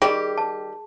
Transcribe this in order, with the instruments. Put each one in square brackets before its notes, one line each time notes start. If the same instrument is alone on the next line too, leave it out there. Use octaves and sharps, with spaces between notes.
[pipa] D#3 G3 G4 [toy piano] G#4
[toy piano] A5